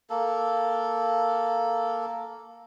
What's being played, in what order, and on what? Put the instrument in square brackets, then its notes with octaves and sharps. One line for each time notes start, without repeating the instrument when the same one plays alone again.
[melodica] A#3 A4